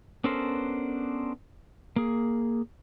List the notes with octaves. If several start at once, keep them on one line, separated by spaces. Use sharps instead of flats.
B3 C#4 D4 A4 A#4 C5
A#3 G#4